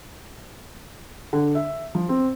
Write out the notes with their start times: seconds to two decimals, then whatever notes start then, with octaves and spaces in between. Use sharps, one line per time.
1.33 D3
1.55 E5
1.95 F3
2.09 C4